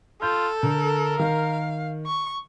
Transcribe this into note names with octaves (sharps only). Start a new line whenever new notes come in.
F4 A4 G6
D3 A#4
D#3 F5
C#6